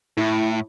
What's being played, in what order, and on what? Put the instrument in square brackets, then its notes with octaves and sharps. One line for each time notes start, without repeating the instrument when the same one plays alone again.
[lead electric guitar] A2 [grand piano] E4